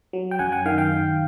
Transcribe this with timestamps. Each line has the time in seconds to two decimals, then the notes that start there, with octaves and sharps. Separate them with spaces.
0.13 F#3
0.31 G5
0.39 F#2 F#5 G#5
0.52 F#5 G#5
0.66 D#3 F5 G5
0.78 F5 G5
0.92 D#3